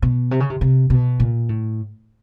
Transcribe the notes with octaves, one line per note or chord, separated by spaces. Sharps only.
B2
C3
C#3
C3
C3
B2
A#2
A2